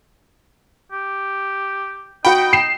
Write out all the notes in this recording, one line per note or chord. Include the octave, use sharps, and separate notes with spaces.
G4
D#4 F#4 G5 B5
C7 E7